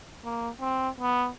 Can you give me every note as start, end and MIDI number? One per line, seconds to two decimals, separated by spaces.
0.24 0.49 58
0.61 0.89 60
1.00 1.29 59